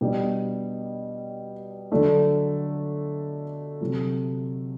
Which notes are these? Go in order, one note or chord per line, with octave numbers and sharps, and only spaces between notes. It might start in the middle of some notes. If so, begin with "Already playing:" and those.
B2 G3 D4 G4
D3 F#3 A3 D4
C3 F#3 A3